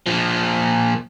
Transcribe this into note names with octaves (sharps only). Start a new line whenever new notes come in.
A#2 F3